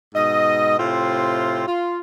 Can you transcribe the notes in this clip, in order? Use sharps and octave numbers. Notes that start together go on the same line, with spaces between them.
G#2 B2 D#5
A2 C3 C4 F4
F4